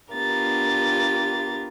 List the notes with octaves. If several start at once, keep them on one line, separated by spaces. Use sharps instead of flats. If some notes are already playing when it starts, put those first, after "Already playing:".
B3 D4 F4 G4 A#4 A6